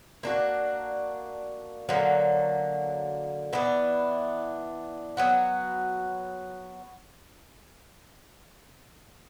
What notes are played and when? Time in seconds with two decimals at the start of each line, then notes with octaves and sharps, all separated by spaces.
0.23 A#3 D4 F#4
1.89 D3 F#3 A#3
3.53 E3 B3 D4
5.17 F#3 B3 F#4